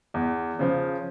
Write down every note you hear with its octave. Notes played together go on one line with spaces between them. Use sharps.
E2
C#3 F3